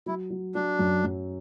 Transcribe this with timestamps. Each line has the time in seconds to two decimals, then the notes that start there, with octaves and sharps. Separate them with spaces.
0.06 F#3 E4
0.30 F#3
0.55 F#3 D4
0.79 F#2
1.04 F#2